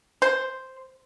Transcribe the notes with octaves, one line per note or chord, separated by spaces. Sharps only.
C5